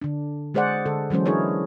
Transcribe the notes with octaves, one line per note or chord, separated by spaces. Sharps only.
D3 D4
G#3 G#4 C5 D5 F#5
D3 A4
E3 F#3 G#3 C#4 C5
D4 E4 G#4 A#4 C#5